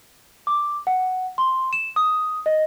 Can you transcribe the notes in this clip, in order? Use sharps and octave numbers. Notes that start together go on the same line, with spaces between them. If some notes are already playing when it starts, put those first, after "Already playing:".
D6
F#5
C6
E7
D#6
D#5